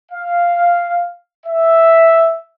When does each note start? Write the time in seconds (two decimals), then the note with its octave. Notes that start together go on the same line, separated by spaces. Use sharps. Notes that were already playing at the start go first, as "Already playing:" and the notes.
0.12 F5
1.47 E5